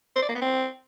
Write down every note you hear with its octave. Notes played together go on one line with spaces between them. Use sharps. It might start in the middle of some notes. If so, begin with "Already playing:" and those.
C5
D5
A#3
B3
C4